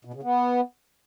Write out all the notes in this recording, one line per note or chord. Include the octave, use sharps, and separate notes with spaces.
B2
C#3
B3